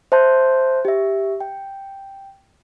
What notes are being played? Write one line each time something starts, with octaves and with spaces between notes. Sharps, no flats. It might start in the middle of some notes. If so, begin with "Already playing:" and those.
C5 E5 A5 C6 G6
G4 E5
G5